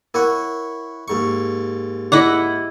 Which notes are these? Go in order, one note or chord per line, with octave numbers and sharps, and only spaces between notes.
E4 A#4 C#5 F#5
D#2 G#2 C#6
E4 G#4 C#5 D#5 F#5 D6